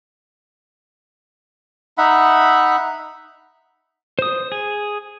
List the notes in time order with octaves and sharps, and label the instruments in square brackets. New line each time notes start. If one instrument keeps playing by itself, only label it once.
[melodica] D#4 E5 F#5 B5
[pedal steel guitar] C5 D#6
G#4